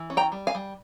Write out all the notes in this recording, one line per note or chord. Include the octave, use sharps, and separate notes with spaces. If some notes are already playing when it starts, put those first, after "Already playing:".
Already playing: E3
C#4
G5 A#5
G3
F5 G#5
G3